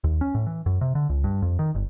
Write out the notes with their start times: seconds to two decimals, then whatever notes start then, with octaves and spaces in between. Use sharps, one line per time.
0.04 D#2
0.21 C#4
0.35 A2
0.46 E3
0.66 F#2
0.81 C3
0.95 D3
1.09 C#2
1.24 G2
1.42 F2
1.59 D#3
1.75 G1